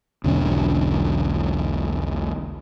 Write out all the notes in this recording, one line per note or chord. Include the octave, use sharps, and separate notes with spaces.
E1 B1 D3 C#4